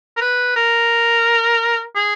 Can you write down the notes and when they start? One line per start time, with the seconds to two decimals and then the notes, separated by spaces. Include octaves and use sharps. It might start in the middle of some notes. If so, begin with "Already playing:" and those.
0.17 A#4
0.21 B4
0.56 A#4
1.96 G#4